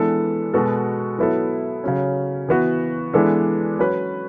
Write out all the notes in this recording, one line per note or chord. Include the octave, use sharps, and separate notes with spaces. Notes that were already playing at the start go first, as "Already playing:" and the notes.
Already playing: E3 G#3 B3 D4 A4
B2 G#3 B3 F#4 A4
F#3 B3 E4 A4
C#3 F#3 C#4
E3 B3 F#4
E3 G#3 B3 D4 A4
F#3 C#4 F#4 B4